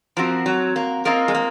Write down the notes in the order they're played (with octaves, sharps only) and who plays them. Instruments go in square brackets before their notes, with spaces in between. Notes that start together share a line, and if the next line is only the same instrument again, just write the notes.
[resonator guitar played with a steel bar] F3 [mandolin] C4 F#4 A#4
[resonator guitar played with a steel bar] F#3
A#3
[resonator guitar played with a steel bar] A#3 [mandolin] C4 F4 A#4 D#5
[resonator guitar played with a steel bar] G#3
A#3